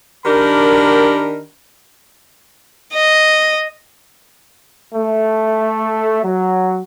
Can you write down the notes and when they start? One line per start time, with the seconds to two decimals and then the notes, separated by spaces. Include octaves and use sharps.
0.25 D#3 D4 G4 A#4 B5
2.94 D#5
4.95 A3
6.22 F#3